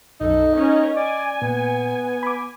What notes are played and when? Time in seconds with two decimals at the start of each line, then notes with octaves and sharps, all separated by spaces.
0.20 B1 F#2 D#4 A4
0.53 C#4 A#4 D#5
0.96 D5 G#5
1.42 A#2 B3
2.23 B5 D6